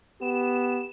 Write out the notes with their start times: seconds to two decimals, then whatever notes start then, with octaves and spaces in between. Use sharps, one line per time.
0.21 B3 G4 E7